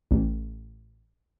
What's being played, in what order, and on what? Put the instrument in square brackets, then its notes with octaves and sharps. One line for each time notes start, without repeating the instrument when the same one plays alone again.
[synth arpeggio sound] A1